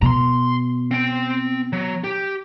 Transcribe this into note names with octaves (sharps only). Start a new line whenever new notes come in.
B2 A#5 C6
C4 G5
F#3
G4